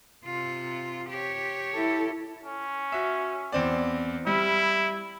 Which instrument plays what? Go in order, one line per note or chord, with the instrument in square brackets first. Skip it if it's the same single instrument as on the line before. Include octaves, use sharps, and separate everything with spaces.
[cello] C3 F4
G4 C#5
[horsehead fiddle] E4 A4
[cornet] C#4
[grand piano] F#4 E5
E2 C4 D5
[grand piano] G3 [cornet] E4